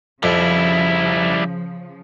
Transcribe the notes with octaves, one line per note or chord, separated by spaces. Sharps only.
F2 C#3 F3 G3 E4